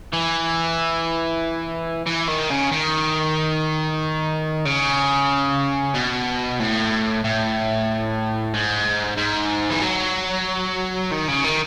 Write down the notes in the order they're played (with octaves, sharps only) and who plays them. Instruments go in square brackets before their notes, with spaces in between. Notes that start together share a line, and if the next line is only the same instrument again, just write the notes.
[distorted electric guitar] E3
E3
D#3
C#3
D#3
C#3
B2
A2
A2
G#2
G#2
E3
F#3
D#3
C#3
D#3